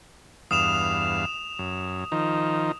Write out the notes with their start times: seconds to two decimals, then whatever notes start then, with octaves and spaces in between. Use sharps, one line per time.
0.51 E2 G2 F5 D#6 E7 F7
1.59 F#2
2.12 D#3 F3 D#4